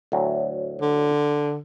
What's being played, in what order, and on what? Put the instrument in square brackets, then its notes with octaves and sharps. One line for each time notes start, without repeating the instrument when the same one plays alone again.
[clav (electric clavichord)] D2 A2 F#3
[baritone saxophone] D3